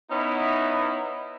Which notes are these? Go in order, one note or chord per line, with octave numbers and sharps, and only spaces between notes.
B3 C#4 D#4 E4